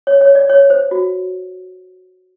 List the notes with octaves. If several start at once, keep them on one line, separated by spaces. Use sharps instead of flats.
C#5
C#5
D5
C#5
C5
F#4